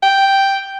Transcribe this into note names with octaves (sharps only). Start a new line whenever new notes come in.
G5